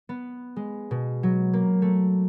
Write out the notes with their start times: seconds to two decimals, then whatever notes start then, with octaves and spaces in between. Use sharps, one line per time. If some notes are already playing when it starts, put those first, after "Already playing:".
0.09 B3
0.56 G#3
0.91 B2
1.23 F#3
1.53 A#3
1.82 A3